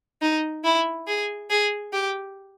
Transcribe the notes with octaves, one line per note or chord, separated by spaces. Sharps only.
D#4
E4
G#4
G#4
G4